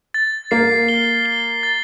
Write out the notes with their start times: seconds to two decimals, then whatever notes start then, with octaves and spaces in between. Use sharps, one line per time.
0.14 A6
0.51 A#3 C7
0.89 G7
1.26 G7
1.63 A6